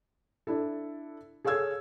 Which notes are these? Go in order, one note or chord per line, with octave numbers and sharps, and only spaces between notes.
D4 E4 A4
G#4 A4 C#5 F5 E6 G#6